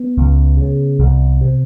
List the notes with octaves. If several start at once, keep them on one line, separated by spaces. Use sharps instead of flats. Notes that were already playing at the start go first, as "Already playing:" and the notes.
Already playing: B3
C#2
C#3
C2
C3